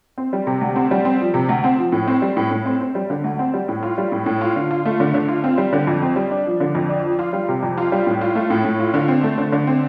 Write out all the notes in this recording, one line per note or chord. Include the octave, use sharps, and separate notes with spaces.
C4
G3
C3
D2
C4
G3
C4
F3
C3
D2
C4
F3
A2
C4
G3
A2
A2
C4
C4
G3
D3
D2
C4
G3
A2
F4
G3
A2
A2
F4
D3
F4
A3
D3
D3
F4
C4
G3
D3
F2
C4
G3
D4
F3
D3
F2
D4
F3
F4
G3
C3
F2
F4
G3
A2
F4
A3
A2
A2
F4
D3
C4
A3
D3
D3
C4